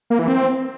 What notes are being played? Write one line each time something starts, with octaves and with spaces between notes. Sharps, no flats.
A#3
E3
C4